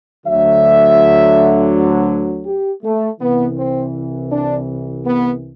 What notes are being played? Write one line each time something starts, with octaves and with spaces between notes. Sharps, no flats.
D2 D3 F#3 E5
G4
A3
C2 C3 E3 B3
C4
D4
B3